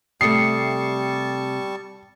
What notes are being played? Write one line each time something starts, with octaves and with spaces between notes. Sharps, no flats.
C3 G3 A3 A5 C#6 D#6 C7 C#7